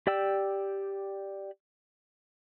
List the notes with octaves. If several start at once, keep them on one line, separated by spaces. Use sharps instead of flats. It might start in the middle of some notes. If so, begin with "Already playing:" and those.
G4 D5 G5 E6